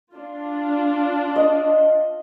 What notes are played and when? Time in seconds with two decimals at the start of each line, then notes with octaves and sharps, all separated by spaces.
0.12 D4 F4
1.36 D#5